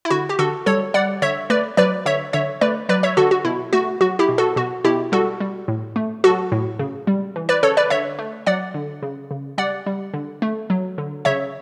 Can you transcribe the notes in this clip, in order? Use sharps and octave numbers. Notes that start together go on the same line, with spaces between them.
E4
D3 F#4
G4
D3 F#4 A4
G3 A4 C#5
G3 D5 F#5
D3 C#5 E5
A3 B4 D5
F#3 B4 D5
D3 C#5 E5
D3 C#5 E5
A3 B4 D5
F#3 B4 D5
C#5 E5
D3 F#4 A4
F#4
B2 E4
A3 F#4
F#3 F#4
E4 G4
B2
F#4 A4
B2 F#4
B2 E4 G4
G3 F#4 A4
G3
A2
A3
F#3 F#4 A4
A2
C#3
G3
E3
B4 D5
C#3 A4 C#5
B4 D5
D3 C#5 E5
A3
F#3 D5 F#5
D3
C#3
C#3
G3 D5 F#5
G3
D3
A3
F#3
D3
C#3 C#5 E5